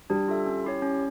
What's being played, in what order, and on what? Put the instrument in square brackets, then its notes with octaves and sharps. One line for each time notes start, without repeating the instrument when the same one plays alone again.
[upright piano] G3 [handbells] D4
[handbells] F4 A4 E5
C#4
E4 G4 C#5
C#4